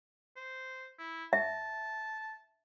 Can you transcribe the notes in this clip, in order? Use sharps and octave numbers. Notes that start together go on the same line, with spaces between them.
C5
E4
E5 A5